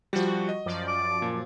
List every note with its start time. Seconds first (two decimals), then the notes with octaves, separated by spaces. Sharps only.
0.13 F3 G3 F#4
0.49 D#5
0.66 F#2 F3 D5
0.88 D6
1.22 A#2